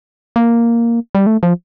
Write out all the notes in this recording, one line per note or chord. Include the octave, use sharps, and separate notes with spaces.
A#3
G3
A3
F3